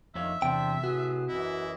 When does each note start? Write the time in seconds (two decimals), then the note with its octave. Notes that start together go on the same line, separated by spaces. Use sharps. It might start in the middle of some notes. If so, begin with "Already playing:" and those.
0.15 F2 D#3 C#5 E5 F5
0.42 E2 C3 D4 C5 G5
0.84 A2 F#4 G#4 B4
1.28 F#2 E3 E4 D#5